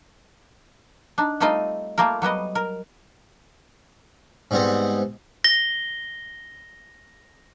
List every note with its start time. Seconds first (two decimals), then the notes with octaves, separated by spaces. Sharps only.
1.18 D4 D#4
1.40 G3 A3 C4 D#4 F4 D#5
1.98 G3 A3 A#3 F4 A#4
2.22 F#3 G3 B3 D#5
2.55 A#4
4.51 G#2 G3 B3 C4
5.44 A#6 G7